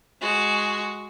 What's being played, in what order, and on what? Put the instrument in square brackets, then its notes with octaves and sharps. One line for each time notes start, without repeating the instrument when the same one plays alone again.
[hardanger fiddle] G#3 F#4